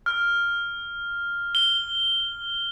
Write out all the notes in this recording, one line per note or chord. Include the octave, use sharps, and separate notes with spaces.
F6
G7